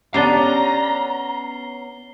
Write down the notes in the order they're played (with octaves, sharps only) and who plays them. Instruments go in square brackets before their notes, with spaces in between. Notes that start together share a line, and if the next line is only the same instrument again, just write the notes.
[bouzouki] B3 C#4 [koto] D4 G4 [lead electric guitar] A#5 [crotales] C7 G7